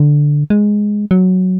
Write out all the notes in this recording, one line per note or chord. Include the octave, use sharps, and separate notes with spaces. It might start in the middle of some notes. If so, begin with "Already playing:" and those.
Already playing: D3
G#3
F#3